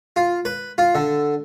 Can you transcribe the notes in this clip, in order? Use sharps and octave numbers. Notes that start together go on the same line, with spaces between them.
F4
B4
F4
D3